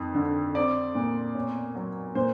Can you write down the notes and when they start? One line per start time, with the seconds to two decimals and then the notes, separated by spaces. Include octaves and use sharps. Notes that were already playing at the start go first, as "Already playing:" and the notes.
Already playing: F2 D#3
0.15 D3
0.55 C4 D5
0.95 A#2
1.35 B2 C#5
1.75 F#3
2.15 A#2 C5